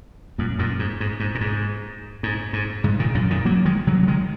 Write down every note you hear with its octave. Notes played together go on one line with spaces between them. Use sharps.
F#2 A#2
F#2 A#2
G#2
G#2
G#2
A#2
G#2
G#2
G#2
G#2 C#3
A#2 D#3
F#2 A#2
A#2 D#3
F#3 A#3
D#3 G#3
C#3 F#3
F#3
D#3 G#3